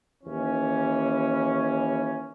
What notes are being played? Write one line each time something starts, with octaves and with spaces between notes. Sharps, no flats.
D#2 E3 C#4